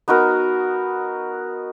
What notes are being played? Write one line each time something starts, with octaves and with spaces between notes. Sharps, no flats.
B3 D#4 F#4 A#4